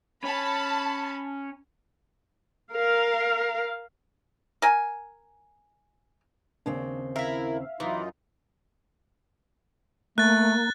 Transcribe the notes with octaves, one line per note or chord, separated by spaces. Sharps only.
C#4 A5 B5
A#4 F5
A#4 G#5
D#2 C#3 C4 D4
E4 A#4 E5 F5
F#2 E3 D#4 F4
A3 A#3 F#6 A6